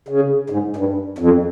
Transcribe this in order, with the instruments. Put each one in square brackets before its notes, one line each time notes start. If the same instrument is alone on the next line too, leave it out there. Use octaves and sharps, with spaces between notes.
[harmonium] C#3
G#2
G2
F2